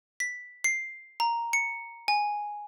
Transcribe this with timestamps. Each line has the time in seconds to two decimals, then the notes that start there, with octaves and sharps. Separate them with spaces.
0.20 B6
0.64 C7
1.20 A#5
1.53 C#7
2.08 G#5